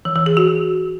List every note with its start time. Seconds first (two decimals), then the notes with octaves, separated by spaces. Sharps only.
0.05 E3
0.16 E3
0.26 G#4
0.37 F#4